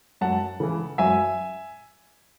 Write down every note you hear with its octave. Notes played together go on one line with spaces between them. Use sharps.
F#2 F#5 A5
C#3 E3
F#2 E5 G#5